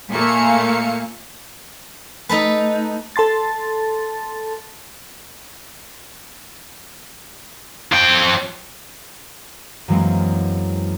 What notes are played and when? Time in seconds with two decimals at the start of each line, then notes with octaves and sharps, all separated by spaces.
0.11 A#2 A3 A#3 F5 G#5 C#7
2.29 A3 D#4 A4 B4
3.16 A4 A5 C6 A6
7.92 F3 G5
9.88 F#2 E3 F#3 G#3 A#3 C4